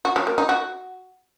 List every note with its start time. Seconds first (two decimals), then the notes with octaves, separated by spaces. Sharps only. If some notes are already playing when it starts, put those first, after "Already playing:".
0.05 F#4
0.16 F#3
0.27 A#3
0.38 D#4
0.49 F#4